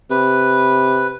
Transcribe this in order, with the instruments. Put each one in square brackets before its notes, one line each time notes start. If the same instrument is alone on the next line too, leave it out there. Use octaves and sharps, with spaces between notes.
[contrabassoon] C3 [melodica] B4